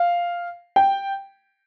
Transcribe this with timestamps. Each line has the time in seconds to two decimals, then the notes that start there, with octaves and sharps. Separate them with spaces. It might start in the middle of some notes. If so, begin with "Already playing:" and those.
Already playing: F5
0.76 G5